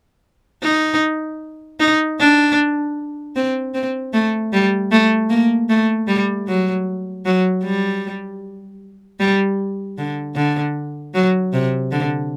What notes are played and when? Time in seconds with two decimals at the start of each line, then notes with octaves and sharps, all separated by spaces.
0.63 D#4
1.80 D#4
2.19 D4
3.36 C4
3.74 C4
4.13 A3
4.53 G3
4.91 A3
5.30 A#3
5.69 A3
6.08 G3
6.48 F#3
7.26 F#3
7.64 G3
9.20 G3
9.98 D3
10.36 D3
11.14 F#3
11.53 C3
11.92 D3